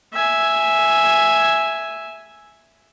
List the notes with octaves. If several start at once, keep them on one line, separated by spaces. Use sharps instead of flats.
E5 G#5